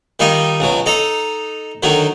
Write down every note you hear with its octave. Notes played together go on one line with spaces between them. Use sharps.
D#3 G3 D#4 F4 D#5
C#2 B2 F#3
D#4 A4 A#5
D3 D#3 F#3 D#4